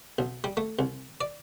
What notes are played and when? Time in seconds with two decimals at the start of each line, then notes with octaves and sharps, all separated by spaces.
0.19 B1
0.44 G3
0.57 A3
0.79 C2
1.21 D5